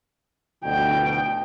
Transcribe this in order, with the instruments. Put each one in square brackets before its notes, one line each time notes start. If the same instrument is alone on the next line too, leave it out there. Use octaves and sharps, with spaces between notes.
[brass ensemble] D2 B2 [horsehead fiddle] G5